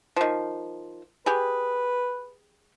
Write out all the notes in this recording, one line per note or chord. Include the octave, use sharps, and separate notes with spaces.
D#3 F3
G4 G#4 B4